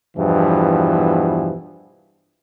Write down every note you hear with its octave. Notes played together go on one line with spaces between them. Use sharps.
E2 G2 B2 E3 F3